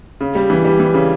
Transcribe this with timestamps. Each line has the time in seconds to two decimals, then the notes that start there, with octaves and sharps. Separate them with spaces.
0.21 C#3
0.35 G3
0.50 E3
0.65 G3
0.80 E3
0.94 C#3